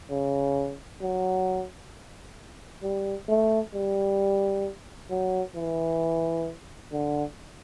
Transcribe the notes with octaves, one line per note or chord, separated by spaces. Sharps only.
C#3
F#3
G3
A3
G3
F#3
E3
D3